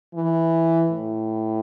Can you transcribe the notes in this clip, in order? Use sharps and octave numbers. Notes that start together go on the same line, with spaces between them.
E3
A2